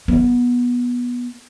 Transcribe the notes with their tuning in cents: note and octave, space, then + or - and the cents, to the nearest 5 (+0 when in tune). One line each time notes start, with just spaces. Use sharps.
B3 -15